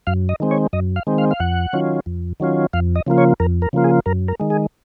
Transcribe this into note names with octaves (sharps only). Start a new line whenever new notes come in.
F#2 F5
D#5
D#3 G#3 C4
C#5
F#2 D#5
F5
D#3 G#3 C4
F5
F5
F2 F#5
D#3 F#3 C#4 F4
F2
D#3 F#3 C#4 F4
F2 F5
D#5
C#3 F3 A#3 F4
C#5
F2 A#4
A#4
C#3 F3 A#3 F4
G#4
F#2 A#4
A#4
D#3 G#3
G#4